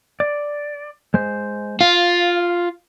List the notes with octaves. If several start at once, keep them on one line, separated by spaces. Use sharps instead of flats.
D5
G#3 C5
F4 F5